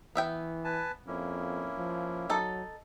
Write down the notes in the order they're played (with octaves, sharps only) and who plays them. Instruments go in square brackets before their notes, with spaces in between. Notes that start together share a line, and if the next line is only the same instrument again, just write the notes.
[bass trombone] E3 [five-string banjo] B3 E5 G5
[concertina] B4 G#5 A5
[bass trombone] F2 [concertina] A#3 C#4 E4
[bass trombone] F3
[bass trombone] F#3 [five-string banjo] D#4 A4